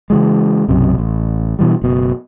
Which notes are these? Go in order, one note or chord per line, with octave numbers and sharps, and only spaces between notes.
C#3 E3 G#3
B1 F#2 C3
A1
B2 E3 G3
F#1 B2